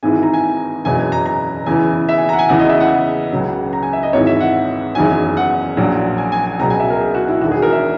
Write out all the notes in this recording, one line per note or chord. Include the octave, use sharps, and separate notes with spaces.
G#1 G#2 E3 G#5
A#5
G#5
F#1 E2 B2 F#3 G#5
G#5
A#5
A#5
E2 C#3 E3 G#5
E5
G#5
A#5
F#5
G#5
E2 C#3 E3 F#5
D#5
E5
F#5
C#2 C#3 F#3
A#5
G#5
E5
D#5
G#1 G#2 E3 C#5
E5
F#5
F#1 E2 D#3 F#3 G#5
F#5
A#1 A#2 F#3
G#5
G#5
G#5
C#2 B2 F#3 A#5
G#5
E5
A#4
G#4
F#4
E4
E1 E2 D#3 F#4
G#4
A#4
E5